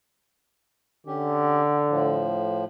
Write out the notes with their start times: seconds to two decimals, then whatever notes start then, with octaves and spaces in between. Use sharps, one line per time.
1.07 D3 C#4 G4
1.89 A2 F3